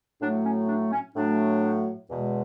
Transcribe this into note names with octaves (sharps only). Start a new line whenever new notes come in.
A2 F#3 A3 D4
C#4
D4
C#4
A2 F#3 A3 D4
E2 B2 G#3